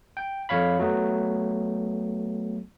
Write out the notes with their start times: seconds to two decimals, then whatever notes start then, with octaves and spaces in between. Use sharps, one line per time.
0.17 G5
0.49 F2 C#5 F5 B5
0.79 F#3 A3 B3